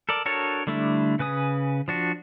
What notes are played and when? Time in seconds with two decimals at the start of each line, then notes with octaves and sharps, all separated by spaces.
0.09 A4 A#4 D5
0.26 D4 F#4 A4 A#4 C#5
0.67 D3 G3 A3 D4 E4
1.19 C#3 B4 G#5 D#6
1.88 F3 D4 F#4